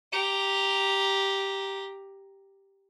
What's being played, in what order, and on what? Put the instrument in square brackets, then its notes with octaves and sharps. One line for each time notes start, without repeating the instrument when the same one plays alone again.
[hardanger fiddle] G4 A#5